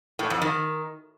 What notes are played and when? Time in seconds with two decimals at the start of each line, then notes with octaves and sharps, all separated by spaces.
0.19 A2
0.30 F2
0.42 D#3